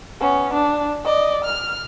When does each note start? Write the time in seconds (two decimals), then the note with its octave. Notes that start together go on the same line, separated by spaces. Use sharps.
0.20 B3 C#4
0.53 D4
1.04 D5 D#5
1.44 F6